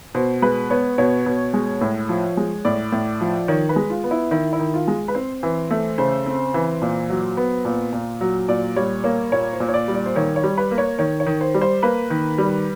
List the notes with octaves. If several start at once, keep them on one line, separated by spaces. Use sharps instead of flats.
B2 C5
G#3 B4
B3 C#5
B2 C#5
B2
G#3
A2
F3
G#3
A2 D5
A2
F3
D#3 C#5
B4
G#3
F4
B3
E4
D#3 E4
E4
D#3
F4
G#3
B4
C4 C5
E3
A3
C#3 C5
C4
E3
A#2
F#3
B3
A#2
A#2
F#3
A#2 D5
G3 C#5
A#3 C#5
A#2 C#5
C5
A#2
C#5
D5
G3
D5
C5
D#3 C#5
C#5
G3
B4
A#3
C#5
D#3 C#5
C#5
D#3
C5
G3
C5
A#3 B4
D#3
G3